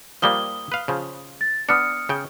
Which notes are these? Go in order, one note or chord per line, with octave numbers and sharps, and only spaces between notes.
F3 G3 A#3 D#6 G7
B4 F5
C#3 F3
A6
B3 D4 D#6 F6 C#7
C#3 G5